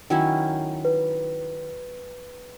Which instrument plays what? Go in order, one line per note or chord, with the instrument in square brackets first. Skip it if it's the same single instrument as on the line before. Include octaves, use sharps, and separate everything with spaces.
[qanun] D#3 F#3 C#4 E4
[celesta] B4